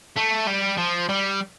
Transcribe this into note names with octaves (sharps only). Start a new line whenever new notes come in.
A3
G3
F3
G3